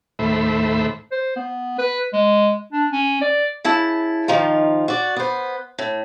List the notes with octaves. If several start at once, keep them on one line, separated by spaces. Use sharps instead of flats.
D#2 A2 A3 C5 E5 B5
C5
B3
B4
G#3
D4
C#4
D5
C#3 E4 A5
D#3 F3 D#4 F4
F#4 D5
B3 C5
A2